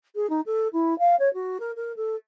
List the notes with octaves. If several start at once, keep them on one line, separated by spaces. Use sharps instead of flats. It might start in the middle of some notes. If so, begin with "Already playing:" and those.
G#4
D#4
A4
E4
F5
C#5
F#4
A#4
A#4
A4